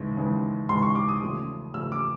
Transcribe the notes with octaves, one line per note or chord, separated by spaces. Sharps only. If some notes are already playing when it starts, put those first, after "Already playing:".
Already playing: D#2 C#3 E3 G#3
D#2 C#3 E3 G#3
D#2 C#3 E3 G#3 C6
C#6
D6
D#6
E2 C#3 F3 A3
E2 C#3 F3 A3 E6
D6